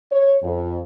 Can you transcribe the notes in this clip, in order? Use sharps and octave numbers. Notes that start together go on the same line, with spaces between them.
C#5
F2